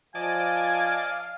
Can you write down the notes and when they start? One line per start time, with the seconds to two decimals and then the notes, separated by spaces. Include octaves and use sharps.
0.15 F3 D5 D#5 F5 G#5 A5